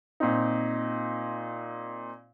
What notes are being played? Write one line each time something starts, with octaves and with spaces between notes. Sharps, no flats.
A#2 C4 D#4